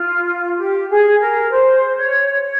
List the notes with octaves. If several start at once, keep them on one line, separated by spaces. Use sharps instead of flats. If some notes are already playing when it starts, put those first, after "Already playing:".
Already playing: F4
G4
G#4
A#4
C5
C#5
C#5